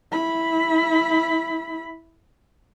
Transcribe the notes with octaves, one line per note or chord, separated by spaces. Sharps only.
E4 B5